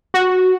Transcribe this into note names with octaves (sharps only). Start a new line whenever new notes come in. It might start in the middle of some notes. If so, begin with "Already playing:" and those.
F#4